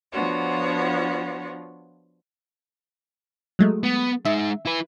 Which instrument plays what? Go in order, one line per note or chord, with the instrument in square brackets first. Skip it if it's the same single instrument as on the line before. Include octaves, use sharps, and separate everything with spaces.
[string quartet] F3 B3 D4 F4 F#4 C#5
[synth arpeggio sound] F#3 G#3 A3
[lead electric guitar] B3
[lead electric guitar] G#3 D#4 [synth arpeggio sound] E5
[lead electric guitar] E4 B4